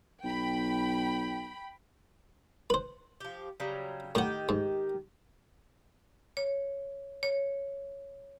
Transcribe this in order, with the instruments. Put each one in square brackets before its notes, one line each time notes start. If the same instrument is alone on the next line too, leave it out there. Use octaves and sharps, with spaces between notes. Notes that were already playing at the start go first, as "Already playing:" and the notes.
[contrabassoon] B1 [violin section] G5 B5
[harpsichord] B4 C5
[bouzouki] F3 G4
C#3 F#3 G3
[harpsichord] A2 F#5 [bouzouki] D#3 G4
[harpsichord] G#2
[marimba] C#5
C#5